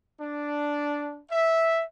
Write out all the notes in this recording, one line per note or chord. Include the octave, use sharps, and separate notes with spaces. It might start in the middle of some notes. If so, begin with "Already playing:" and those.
D4
E5